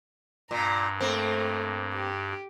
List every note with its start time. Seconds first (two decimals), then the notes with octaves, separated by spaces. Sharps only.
0.51 G2 A#2 A#5
1.00 A3 A#3 C4
1.94 G4